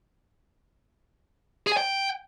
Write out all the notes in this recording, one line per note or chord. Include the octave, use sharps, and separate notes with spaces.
G#4
G#5
G5